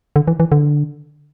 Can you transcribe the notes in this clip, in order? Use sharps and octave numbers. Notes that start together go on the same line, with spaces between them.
D3
E3
E3
D3